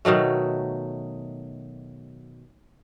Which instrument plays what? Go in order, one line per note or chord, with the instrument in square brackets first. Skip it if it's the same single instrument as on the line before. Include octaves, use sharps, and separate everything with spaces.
[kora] B2 D#3 F#3 A3